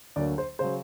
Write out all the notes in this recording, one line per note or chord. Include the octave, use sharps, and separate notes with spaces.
D2 D3 F#3 A#3 D5
C5
C#3 F#3 C5